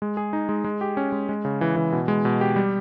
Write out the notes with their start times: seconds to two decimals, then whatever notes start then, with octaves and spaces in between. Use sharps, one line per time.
0.02 G#3
0.17 G#4
0.33 D#4
0.49 G#3
0.64 G#3
0.81 G4
0.97 C#4
1.12 G#3
1.29 G#3
1.45 C#3
1.61 E3
1.76 E3
1.92 B2
2.08 G#3
2.25 B2
2.41 G4
2.56 G3